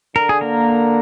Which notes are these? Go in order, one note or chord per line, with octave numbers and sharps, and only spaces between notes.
D3 A#4
G#4
A#3 A#4